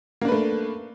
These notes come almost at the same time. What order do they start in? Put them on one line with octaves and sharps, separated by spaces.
A#3 D4 B4 A3